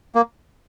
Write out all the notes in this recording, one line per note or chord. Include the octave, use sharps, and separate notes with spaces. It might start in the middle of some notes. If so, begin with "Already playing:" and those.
A#3